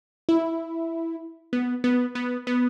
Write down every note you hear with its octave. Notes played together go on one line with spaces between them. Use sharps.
E4
B3
B3
B3
B3